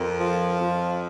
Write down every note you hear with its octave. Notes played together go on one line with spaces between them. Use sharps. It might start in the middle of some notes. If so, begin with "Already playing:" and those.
Already playing: F2 A#4
F3
F2